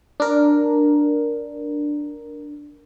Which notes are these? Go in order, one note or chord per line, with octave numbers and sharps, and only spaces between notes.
D4 A#4